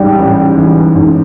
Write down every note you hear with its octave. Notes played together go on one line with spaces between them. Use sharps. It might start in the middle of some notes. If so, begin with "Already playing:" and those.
Already playing: A1 G#2 G3
A1
E3
G#2